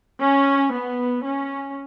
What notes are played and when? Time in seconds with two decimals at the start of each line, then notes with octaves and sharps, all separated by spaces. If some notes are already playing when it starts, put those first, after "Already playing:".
0.20 C#4
0.74 B3
1.25 C#4